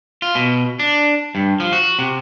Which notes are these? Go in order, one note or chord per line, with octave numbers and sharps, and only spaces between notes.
F4
B2
D4
G2
F3
F#4
C3